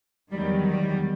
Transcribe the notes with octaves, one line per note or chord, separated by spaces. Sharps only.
E2 D#3 F#3 G3
G3